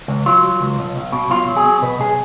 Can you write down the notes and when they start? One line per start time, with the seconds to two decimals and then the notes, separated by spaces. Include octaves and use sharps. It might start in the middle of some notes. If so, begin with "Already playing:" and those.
0.08 C#2
0.26 F#3 F4
0.43 F#3
0.60 C#2
0.79 B1
0.96 B1
1.12 B2
1.30 B1 F4
1.48 F#3
1.57 G#4
1.65 B2
1.82 B2 B4
2.00 B1 G#4